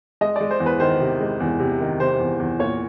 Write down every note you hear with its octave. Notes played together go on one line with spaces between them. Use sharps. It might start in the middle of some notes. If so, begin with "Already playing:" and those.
G#3 D#5
G#3 D5
C5
E2
B4
D#3 C5
C3
G#3
E2
C3
D#3
C3 C5
E2
E2
A#2 C#5